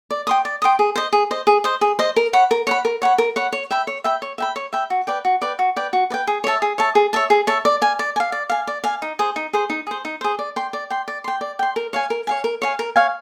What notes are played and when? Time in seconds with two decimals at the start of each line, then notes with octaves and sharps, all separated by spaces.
0.11 D5
0.27 G5 C6 D#6
0.45 D5
0.62 G5 C6 D#6
0.79 G#4
0.96 C5 D#5
1.13 G#4
1.31 C5 D#5
1.47 G#4
1.64 C5 D#5
1.81 G#4
1.99 C5 D#5
2.16 A#4
2.33 C#5 F#5 B5
2.51 A#4
2.67 C#5 F#5 B5
2.85 A#4
3.02 C#5 F#5 B5
3.18 A#4
3.36 C#5 F#5 B5
3.53 C#5
3.71 E5 G5 B5
3.87 C#5
4.04 E5 G5 B5
4.22 C#5
4.38 E5 G5 B5
4.56 C#5
4.73 E5 G5 B5
4.90 F#4
5.07 B4 D5 G5
5.25 F#4
5.42 B4 D5 G5
5.59 F#4
5.76 B4 D5 G5
5.93 F#4
6.10 B4 D5 G5
6.27 G#4
6.44 C#5 E5 A5
6.62 G#4
6.78 C#5 E5 A5
6.95 G#4
7.13 C#5 E5 A5
7.30 G#4
7.47 C#5 E5 A5
7.65 D5
7.82 F5 G#5
7.99 D5
8.16 G#5
8.20 F5
8.32 D5
8.50 F5 G#5
8.67 D5
8.84 F5 G#5
9.02 D#4
9.19 G#4 C5
9.36 D#4
9.53 G#4 C5
9.70 D#4
9.87 G#4 C5
10.05 D#4
10.21 G#4 C5
10.39 D5
10.56 G5 C6
10.73 D5
10.90 G5 C6
11.08 D5
11.24 G5 C6
11.41 D5
11.59 G5 C6
11.76 A#4
11.93 C#5 F5 G#5
12.10 A#4
12.27 C#5 F5 G#5
12.44 A#4
12.62 C#5 F5 G#5
12.79 A#4
12.96 C#5 F5 G#5